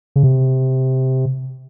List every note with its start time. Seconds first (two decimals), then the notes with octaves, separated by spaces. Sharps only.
0.16 C#3
0.23 C3